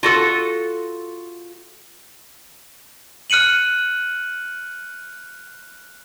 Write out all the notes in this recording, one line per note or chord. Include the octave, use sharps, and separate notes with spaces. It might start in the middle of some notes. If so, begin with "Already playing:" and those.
F4 F#4 A4
F6 F#6 C#7 D#7 F#7